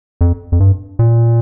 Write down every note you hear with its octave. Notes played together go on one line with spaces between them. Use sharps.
F2
F2
G2
A#2